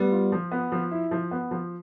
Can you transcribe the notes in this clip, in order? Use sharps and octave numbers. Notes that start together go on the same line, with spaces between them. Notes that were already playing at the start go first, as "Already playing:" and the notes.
Already playing: G3 B3
F4
F3
B3
F3
E4
F3
B3
F3